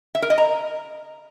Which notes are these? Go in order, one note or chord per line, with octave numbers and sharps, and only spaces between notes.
E5
A#4
D#5
A#5